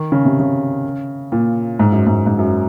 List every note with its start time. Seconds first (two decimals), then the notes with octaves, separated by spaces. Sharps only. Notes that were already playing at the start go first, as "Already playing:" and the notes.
Already playing: D#3
0.12 C#3
0.25 C3
0.40 C#3
1.32 A#2
1.79 G#2
1.92 F#2
2.07 G#2
2.26 G#2
2.39 F#2